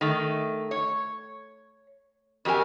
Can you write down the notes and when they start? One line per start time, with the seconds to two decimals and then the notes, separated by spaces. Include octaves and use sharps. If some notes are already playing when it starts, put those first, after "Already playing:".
0.01 D#3 A3
0.71 C#5
2.45 F2 F#4 G4 A#4 G#5